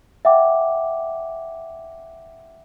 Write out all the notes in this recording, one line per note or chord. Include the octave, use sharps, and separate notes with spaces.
E5 F#5 G5 D6